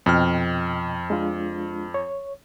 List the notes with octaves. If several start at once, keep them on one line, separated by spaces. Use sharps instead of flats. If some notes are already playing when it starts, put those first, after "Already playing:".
F2 B2 D#5 G5 F6
G#3 D4 F4
C#5